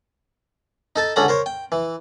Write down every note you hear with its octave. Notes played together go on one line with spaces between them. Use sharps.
D#4 A4 A5
C#2 D3 C#4 A4 F#5 A#5
A#4 C5 C#5
G5
E3